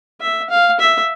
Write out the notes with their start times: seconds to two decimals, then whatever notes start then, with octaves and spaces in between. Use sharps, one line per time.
0.21 E5
0.50 F5
0.80 E5